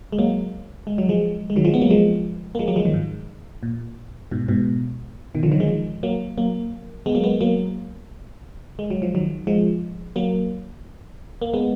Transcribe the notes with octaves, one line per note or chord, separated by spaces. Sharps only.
G#3
F#3 A#3
G#3
F#3
F3 G#3
G#3
D#3 F#3
F3 G#3
B3
F#3 A#3
F3 G#3
A#3
F3 G#3
F#3 A#3
F3 G#3
D#3 F#3
G#2
A#2
G#2 B2
G#2 B2
B2 D#3
D3 F3
D#3 F#3
F3 G#3
F#3 A#3
F#3 A#3
G#3 B3
F#3 A#3
G#3 B3
F#3 A#3
G#3
F#3
F3
D#3 F#3
F3 G#3
F#3 A#3
A#3
G#3 B3